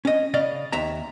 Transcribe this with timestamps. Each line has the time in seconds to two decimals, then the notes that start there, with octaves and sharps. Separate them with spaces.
0.05 C#4 D#5
0.34 C#3 D5 D#5 F5
0.72 D#2 E5 A#5